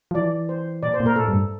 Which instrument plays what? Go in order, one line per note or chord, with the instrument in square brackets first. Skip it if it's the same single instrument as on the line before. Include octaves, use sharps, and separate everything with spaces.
[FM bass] F3
[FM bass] E3 [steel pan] D5
[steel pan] C5
[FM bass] A#2 [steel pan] D5
[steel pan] C5
[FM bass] A#2
[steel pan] A#4
[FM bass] A2 [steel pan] A4
[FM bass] G2